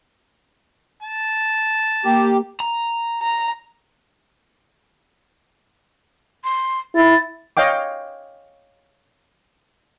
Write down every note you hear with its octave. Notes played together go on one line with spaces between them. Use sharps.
A5
A#3 G4
A#5
A#5
C6
E4 A6
C#5 D#5 F5 G5 D6